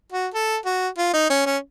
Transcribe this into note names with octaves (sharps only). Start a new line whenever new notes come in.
F#4
A4
F#4
F4
D#4
C#4
C#4